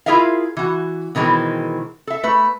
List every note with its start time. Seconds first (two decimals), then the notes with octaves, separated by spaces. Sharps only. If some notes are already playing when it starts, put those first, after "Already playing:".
0.06 E4 F4 G#4 A#4 E5 F5
0.57 E3 F#4
1.15 B2 D#3 E3 G#3 C4
2.07 A4 E5
2.23 A3 B4